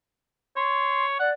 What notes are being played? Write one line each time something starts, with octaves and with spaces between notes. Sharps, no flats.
C#5 C6
D5 F#5